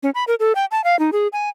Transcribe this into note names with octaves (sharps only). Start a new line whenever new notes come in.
C#4
B5
A#4
A4
G5
A5
F5
D#4
G#4
G#5